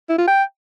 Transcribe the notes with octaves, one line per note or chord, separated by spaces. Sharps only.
E4
F4
G5